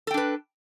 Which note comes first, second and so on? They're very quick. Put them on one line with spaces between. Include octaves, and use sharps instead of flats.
A4 G5 D4 B4